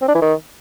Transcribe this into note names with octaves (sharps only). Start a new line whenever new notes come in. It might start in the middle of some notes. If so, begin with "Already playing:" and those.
C4
D4
E3
D#3